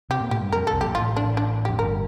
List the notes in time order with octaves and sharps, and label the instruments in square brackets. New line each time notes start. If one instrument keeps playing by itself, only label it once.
[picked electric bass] C3 C4 [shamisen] G4
[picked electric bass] A#2 A#3
[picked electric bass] A2 A3 [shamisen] G4
[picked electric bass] G2 G3
[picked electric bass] F2 F3 [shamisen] A#4
[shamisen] A4
[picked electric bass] C2 C3
[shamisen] G4
[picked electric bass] A#1 A#2
[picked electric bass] A1 A2 [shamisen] F4
[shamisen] D4
D4
G4
[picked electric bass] F2
[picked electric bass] G1 G2 [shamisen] A#4